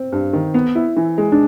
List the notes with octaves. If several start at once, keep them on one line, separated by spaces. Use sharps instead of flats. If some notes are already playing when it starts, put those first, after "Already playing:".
Already playing: C4
G2
D#3
B3
E4
E3
G#3
D4